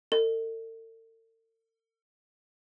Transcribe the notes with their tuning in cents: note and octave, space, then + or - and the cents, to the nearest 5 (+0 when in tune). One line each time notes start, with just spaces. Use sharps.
A4 +45 D#5 -20